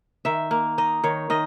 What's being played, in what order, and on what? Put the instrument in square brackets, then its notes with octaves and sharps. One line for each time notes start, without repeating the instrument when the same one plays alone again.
[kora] D#3 E5
A#3
D#4 D#5
D#3 C#5
D#3 D#5